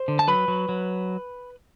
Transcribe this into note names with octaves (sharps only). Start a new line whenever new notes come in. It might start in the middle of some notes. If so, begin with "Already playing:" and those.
Already playing: C5
D3
A5
F#3 B4 B5
F#3
F#3